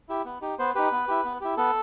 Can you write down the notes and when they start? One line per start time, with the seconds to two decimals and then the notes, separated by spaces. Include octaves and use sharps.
0.09 E4 G4
0.25 B3
0.41 D#4 G4
0.59 B3 C5
0.75 D#4 G4 B4
0.92 B3
1.08 E4 G4
1.25 B3
1.41 E4 G4
1.57 B3 A4